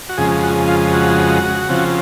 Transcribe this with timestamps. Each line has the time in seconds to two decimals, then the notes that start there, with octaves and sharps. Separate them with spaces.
0.09 F#4
0.17 F2 C#3 G#3 G#4
0.43 F#4
0.68 F4
0.93 F#4
1.69 C#3 F3 C4